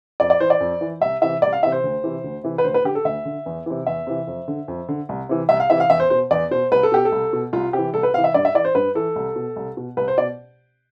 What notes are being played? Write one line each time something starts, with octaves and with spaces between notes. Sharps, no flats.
F2 D5
D5
E3 C5
D5
F2
E3
C2 E5
C3 E3 E5
C2 D5
F5
C3 E3 E5
C5
D2
C3 E3
D2
C3 E3
B4
D2 C5
B4
D3 G4
A4
D2 E5
D3
E2
C3 E3
E2 E5
C3 E3
F2
D3
F2
D3
C2
C3 E3
C2 E5
F5
C3 E3 E5
F5
E2 E5
C5
B2 C5
E2 D5
B2 C5
C2 B4
A4
B2 G4
A4
C2
B2
C2 F4
C3 E3 G4
C2 A4
B4
C3 E3 F5
E5
G2 D5
E5
E3 D5
C5
G2 B4
E3 A4
C2
B2
C2
B2
C2 B4
C5
B2 D5